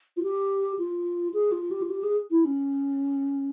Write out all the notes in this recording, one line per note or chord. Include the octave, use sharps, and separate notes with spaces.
F4
G4
F4
G#4
F4
G4
F4
G4
G#4
E4
C#4